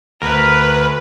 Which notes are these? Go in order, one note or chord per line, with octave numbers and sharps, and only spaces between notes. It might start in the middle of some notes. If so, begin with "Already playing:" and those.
D2 A#4 B4